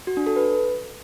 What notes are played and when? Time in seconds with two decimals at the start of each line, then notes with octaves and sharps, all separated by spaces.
0.07 F#4
0.17 D4
0.27 A4
0.36 B4